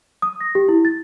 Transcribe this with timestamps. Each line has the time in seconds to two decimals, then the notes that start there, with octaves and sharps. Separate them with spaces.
0.22 D#6
0.41 A#6
0.55 G4
0.69 E4
0.85 A6